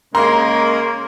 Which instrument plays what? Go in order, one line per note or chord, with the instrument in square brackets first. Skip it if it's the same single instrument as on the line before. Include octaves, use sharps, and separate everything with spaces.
[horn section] C#3 G#3 A#3 [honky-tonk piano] A#5 C6